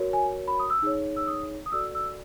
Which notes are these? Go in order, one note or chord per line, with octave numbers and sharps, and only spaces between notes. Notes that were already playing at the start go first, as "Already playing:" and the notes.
Already playing: F#4 A#4 C#5
G#5
B5
D#6
E6
D#4 G#4 C#5
E6
D#6
D#6
F#4 A4 D5 E6
E6